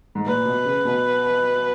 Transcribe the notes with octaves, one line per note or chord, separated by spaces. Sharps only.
G#2
A#2 B4
B2
C#3
B2